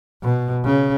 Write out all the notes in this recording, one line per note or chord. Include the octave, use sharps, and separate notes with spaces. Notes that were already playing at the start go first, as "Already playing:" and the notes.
B2
C#3